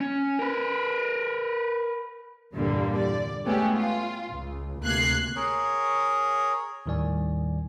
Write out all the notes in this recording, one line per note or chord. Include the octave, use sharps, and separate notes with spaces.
C#4
A#4 B4
E2 G2 A#2 D3 G3 A#3
D5
G#3 A3 B3 C#4 G4 G#4
F4
C#2
D2 C3 A#3 F#6 G#6 C7
G#4 A#4 C#5
D#2 A2 D#3 G3 D5 G#5